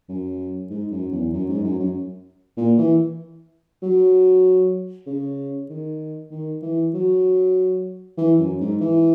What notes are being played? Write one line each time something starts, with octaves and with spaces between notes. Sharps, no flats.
F#2
G#2
F#2
E2
F#2
G#2
F#2
F#2
A#2
E3
F#3
C#3
D#3
D#3
E3
F#3
E3
F#2
G#2
E3